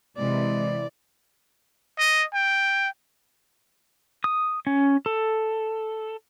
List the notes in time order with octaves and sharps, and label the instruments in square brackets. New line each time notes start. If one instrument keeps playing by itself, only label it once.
[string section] C3 E3 [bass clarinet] G#3 [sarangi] D5
[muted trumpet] D#5
G5
[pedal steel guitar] D#6
C#4
A4